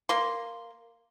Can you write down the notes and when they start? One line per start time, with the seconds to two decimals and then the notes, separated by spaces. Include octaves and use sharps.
0.09 A#3 C6